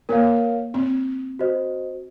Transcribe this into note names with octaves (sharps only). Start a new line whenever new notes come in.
A#3 A#4 C#5 F5
C4
F#4 C5 D#5